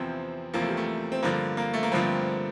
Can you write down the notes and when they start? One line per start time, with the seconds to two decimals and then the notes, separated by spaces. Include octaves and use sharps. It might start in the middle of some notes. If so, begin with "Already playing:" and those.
Already playing: E2 C3 F3 C4
0.54 E2 C3 F3 A#3
0.61 A3
0.69 G3
0.77 A3
1.12 C4
1.23 G2 D3 F3 A#3
1.57 A#3
1.74 A3
1.83 A#3
1.92 G2 D3 F3 C4